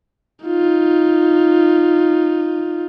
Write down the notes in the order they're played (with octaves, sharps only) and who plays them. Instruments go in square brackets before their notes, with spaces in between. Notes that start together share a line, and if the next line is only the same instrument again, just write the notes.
[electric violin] D#4 F4